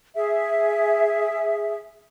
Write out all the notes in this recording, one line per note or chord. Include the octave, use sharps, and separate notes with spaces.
G#4 E5